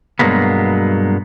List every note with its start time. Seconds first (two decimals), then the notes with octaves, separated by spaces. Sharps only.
0.19 G2 B2 F#3 G#3 A#3 B3